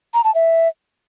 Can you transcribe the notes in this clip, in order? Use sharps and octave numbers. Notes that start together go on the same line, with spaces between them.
A#5
A5
E5